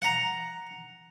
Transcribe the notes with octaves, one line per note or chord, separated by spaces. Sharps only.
F#5 A#5